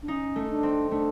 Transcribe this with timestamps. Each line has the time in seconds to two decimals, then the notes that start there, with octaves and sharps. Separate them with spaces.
0.02 D4
0.08 C#4 D#4
0.36 A3
0.49 D4
0.63 C4
0.91 A3 D4